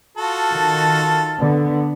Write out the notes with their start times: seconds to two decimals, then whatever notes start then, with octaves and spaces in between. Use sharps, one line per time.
0.18 F4 F#4 A4 A5
0.52 D#3
1.38 D3 B3